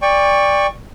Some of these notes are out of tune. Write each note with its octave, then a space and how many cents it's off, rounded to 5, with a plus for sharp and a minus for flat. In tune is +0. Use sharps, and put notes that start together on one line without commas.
D5 +0 G5 +30 C#6 +0